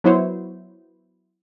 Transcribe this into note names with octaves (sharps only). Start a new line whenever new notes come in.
F#3 B3 E4 C5 C#5